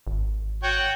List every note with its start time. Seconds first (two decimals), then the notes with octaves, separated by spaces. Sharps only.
0.07 G#1
0.63 F#4 C#5 G5